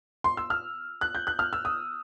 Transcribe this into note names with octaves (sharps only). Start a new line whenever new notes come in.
C6
E6
F6
F#6
G6
F#6
F6
E6
D#6